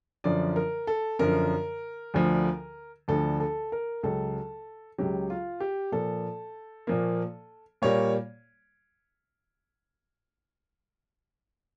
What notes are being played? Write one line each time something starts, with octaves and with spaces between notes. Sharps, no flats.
F#2 D3 F3 D5
A#4
A4
F#2 D3 F3 A#4
D2 D3 F3
D2 D3 F3 A4
A4
A#4
C#2 C#3 F#3 A4
C#2 C#3 F#3 G4
F4
G4
A#2 F3 A#3 A4
A#2 F3 A#3
A#2 G3 A#3 C#5